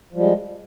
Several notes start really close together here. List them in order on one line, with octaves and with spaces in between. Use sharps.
F3 G3 G#3